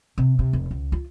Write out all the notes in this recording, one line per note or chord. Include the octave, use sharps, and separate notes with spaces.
C3
C3
F1
C#2
F4